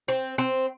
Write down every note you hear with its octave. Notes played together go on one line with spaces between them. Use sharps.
C4
C4